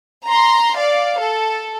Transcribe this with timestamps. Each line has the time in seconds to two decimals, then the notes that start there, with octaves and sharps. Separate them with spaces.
0.25 A#5 C6
0.77 D5 F5
1.19 A4